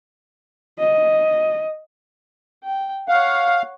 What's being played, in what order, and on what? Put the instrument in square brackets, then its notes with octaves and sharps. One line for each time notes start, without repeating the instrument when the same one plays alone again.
[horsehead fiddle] D#5
[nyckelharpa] G5
[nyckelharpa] C#5 F#5 [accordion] F5